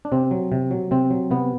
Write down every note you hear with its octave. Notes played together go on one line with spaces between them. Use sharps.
D4
C3 C4
F#3
C3
F#3
C3 C4
F#3
C3 B3